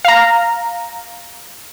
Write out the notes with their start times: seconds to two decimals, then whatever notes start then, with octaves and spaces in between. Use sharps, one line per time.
0.05 F5 A#5